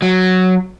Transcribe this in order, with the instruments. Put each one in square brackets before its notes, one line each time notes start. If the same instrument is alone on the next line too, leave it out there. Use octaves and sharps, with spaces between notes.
[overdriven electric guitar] F#3